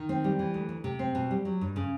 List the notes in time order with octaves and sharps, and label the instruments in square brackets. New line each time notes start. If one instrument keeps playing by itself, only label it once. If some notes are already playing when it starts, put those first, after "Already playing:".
Already playing: [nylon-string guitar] D#3
C4
G3
E3
D2
D2
C3
C4
B2
G3
F#3
G2
C#3